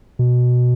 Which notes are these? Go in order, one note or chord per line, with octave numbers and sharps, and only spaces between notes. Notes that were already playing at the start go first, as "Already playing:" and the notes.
B2